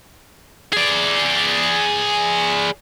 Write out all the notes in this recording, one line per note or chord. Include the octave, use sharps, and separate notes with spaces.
G#4 D5